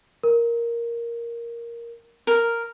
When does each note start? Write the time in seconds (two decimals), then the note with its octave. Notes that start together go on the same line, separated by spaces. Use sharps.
0.23 A#4
2.27 A#4